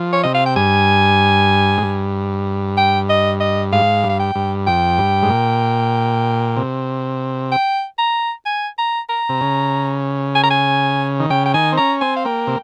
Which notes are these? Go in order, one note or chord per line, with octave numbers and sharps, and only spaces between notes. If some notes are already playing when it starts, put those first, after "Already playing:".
Already playing: F3
C#5
C3 D#5
F5
G5
G2 G#5
G#2
G2
G5
D#5
D#5
G#2 F5
G2
F5
G5
G2
F2 G5
G2
G#2
A#2
C3
G5
A#5
G#5
A#5
A#5
C3
C#3
G#5
A#5
G#5
D#3
C#3 G5
G5
D#3 G#5
C4
C#4 A#5
C4 G#5
F5
A#3 G5
C3